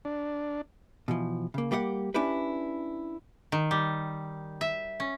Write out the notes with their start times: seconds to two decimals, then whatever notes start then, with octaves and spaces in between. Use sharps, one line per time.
0.05 D4
1.08 B2 E3 F3
1.54 C#3 A#3
1.71 G3 A#3 G4 D5 F#5
2.14 C#4 D4 E4 G4 B4
3.52 D#3
3.71 G3
4.61 E5
5.00 C#4